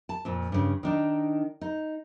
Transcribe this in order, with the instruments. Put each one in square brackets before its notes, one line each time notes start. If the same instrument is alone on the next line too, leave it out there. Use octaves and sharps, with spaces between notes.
[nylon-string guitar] A5
F2 A#2
G2 C#3
D#3 D4 D#4
D#4